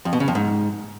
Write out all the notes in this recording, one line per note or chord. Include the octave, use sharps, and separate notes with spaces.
F2
B2
C#3
F2
G#2